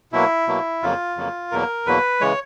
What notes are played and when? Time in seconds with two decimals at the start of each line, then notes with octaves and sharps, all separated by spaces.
0.12 B2 F#3 A#3 E4
0.48 B2 F#3 A#3
0.82 F2 C#3 F#3 A#3 F4
1.17 F2 C#3 F#3 A#3
1.51 E2 B2 F#3 A#3 A#4
1.86 E2 B2 F#3 A#3 B4
2.20 C#3 E3 G#3 C#5